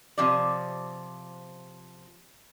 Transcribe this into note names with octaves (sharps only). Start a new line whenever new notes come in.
C3 F3 D5